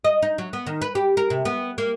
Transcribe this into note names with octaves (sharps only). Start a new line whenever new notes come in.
D#5
D#4
F#3
B3
D#3
B4
G4
A#4
C3
B3
A#3